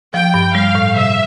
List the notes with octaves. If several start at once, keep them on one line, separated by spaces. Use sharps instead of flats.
F3 G5
G2
G3 F5
A2
C3 E5